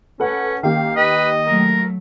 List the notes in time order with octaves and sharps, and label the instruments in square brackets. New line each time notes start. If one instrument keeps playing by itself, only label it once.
[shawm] C#4 [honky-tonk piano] A4 B4 F#5
[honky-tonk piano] D#3 A#3 G4 [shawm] F5
[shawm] B4 [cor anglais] D#5
[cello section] F#3 A3 [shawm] A#4